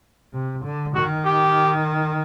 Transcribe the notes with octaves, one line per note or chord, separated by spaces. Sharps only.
C3
D3
D#3 F#4
G4